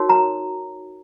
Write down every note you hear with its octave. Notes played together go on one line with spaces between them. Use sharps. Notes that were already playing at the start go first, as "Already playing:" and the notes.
Already playing: D#4 F#4 A#4 C#5
A#5